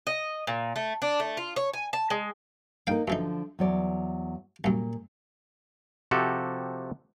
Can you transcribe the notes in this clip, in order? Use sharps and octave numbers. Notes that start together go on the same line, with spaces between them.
D#5
A#2
A3
D4
A3
F4
C#5
G#5
A5
G#3
A#3 D#4 A#4 F5 G5
F#2 D3 E3 F3 D#4
E2 F#3 D5
C2 F#2 A#2
C3 F3 F#4 G4 A4